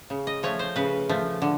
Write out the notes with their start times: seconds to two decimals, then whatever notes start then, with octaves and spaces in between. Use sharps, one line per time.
0.10 C#3
0.27 D#5
0.43 F3 A3 C#5
0.59 C5
0.76 C#3 B4
1.09 F3 A3
1.42 D3